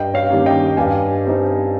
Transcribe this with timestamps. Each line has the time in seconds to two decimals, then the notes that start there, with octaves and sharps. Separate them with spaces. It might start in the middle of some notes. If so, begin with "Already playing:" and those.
Already playing: G2 D#5 G5
0.14 C#5 F5
0.30 D#3 G3 A#3 C#4
0.46 D#5 G5
0.77 G2 F5 G#5
1.25 G3 C4 D#4